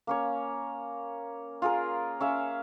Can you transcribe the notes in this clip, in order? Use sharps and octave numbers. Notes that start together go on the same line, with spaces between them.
A#3 C#4 C#5
F4 G#4 A#4
C#4 E5 F5